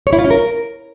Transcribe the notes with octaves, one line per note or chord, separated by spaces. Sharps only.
C#5
E4
F4
C#4
A#4